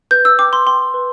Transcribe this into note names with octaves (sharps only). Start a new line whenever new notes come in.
B4 G6
E6
G5 D6
C6
G5 C6
B4